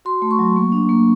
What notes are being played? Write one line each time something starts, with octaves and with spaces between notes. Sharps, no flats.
F#4 C6
A3
C#6
F#3
A#3
D4
A#3